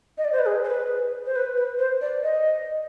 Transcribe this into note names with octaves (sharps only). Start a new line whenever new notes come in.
D#5
D5
C5
B4
G#4
C5
B4
C5
B4
B4
C5
D5
D#5